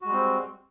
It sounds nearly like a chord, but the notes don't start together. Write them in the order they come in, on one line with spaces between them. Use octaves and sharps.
F#4 G#3 G3 C4